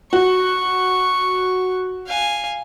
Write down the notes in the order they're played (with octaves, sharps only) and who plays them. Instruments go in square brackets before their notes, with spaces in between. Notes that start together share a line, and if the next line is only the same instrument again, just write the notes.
[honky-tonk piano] F#4 [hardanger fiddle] C#6
[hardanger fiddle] F5 G#5